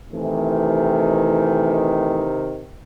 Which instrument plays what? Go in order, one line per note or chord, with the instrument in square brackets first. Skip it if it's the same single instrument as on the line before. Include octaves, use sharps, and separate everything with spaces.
[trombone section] C3 D#3 [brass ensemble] E3 A3